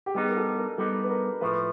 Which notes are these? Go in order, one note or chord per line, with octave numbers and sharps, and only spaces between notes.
G4
G3 B3 D#4 G#4
A#4
A4
A#4
G3 B3 D#4 A4
B4
A#4
A2 F3 A3 B4